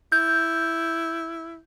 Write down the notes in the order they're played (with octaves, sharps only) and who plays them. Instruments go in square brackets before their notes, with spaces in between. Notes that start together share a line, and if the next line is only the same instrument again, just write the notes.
[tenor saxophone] E4 [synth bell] G6